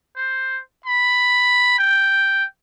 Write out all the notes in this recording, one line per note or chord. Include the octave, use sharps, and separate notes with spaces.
C5
B5
G5